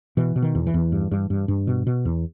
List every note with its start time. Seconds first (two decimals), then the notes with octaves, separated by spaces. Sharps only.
0.17 B2 E3
0.36 B2
0.42 D#3
0.55 E2
0.67 E3
0.74 E2
0.92 G2
1.12 G2
1.30 G2
1.48 G2
1.67 B2
1.87 B2
2.05 E2